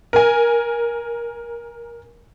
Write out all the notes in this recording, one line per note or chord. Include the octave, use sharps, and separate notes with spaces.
A#4 G#5